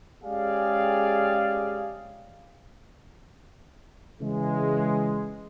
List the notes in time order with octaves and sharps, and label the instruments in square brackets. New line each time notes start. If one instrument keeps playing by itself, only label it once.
[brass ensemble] G#3 C#4 G4 G#4 D5 F5
C#3 E3 G#3